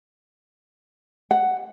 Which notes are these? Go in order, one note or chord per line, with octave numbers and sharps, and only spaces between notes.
F#5